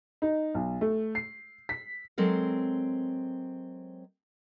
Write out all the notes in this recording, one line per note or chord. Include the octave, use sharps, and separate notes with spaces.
D#4
B1
A3
C7
B6
F#3 G#3 C4 A4 A#4